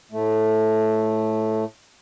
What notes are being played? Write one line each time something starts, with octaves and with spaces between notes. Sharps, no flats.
A2 A3